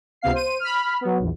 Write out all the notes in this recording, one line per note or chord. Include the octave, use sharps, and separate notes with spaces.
C#2 C3 B3 F5 C7
C5 D#7
B5 F6
F#3 B3
A#1 E2